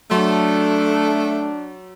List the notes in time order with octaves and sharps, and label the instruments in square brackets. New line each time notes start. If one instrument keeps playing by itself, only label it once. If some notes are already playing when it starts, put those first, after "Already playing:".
[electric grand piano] F#3 C6 [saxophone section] A3 [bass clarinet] D4